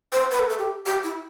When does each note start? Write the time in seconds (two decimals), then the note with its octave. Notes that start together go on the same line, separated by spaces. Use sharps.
0.12 C5
0.31 B4
0.39 A4
0.49 A4
0.59 G4
0.86 G4
1.03 E4